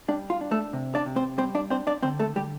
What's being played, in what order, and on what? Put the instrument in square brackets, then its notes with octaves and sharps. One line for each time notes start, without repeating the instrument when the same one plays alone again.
[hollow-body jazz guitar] G3 D4
F4
D4
A3 A4
C3
D4 D5
C3
C4 C5
G3 C4 C5
D4 D5
C4 D4 C5
D4 D5
D3 C4 C5
A3 A4
D3 G3 G4